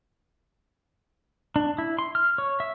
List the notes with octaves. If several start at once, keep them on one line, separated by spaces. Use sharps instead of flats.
D4
E4
C6
F6
C#5
E5